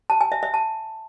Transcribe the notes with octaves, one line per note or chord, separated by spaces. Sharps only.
A5
G#5
E5
E5
A5